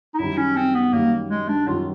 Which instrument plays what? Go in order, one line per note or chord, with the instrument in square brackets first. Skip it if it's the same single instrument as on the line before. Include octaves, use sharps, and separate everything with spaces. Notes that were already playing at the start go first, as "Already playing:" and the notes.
[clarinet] D#4
[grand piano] F#2 D#3 G3 [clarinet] E4
[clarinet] C#4
C4
B3
[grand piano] F#2 D#3 G3 [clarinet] A#3
[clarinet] G#3
D4
[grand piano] F#2 D#3 G3 [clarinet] F4